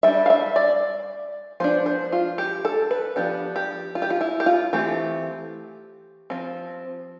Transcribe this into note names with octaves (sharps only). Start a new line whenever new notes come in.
G3 D4 E5
F5
E5
D5
F3 B3 D4 C5
C5
F4
G4
A4
B4
F3 B3 D4 G4
G4
F4
G4
F4
E4
G4
F4
E3 A3 C4 G4
F3 C4